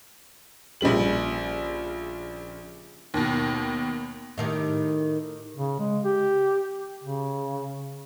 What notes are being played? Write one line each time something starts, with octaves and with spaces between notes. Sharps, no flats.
A#1 C#3 G3 F#7
D#2 B2
A2 D#3 G4
C#3
G#3
G4
C#3